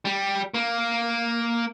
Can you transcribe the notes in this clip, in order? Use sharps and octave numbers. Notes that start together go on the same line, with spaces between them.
G3
A#3